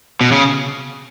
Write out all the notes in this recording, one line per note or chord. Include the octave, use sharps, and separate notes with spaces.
B2
C#3